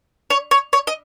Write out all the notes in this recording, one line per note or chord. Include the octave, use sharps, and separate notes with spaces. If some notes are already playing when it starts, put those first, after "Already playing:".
C#5
C#5
C#5
D#5